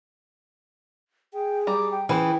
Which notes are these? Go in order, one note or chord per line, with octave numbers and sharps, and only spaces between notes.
G#4 G5
G3 A#5 D6
G5
E3 C#4 G#4 B4 C5 G5